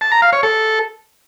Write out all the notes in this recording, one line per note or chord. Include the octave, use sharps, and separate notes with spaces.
A5
A#5
F5
C#5
A4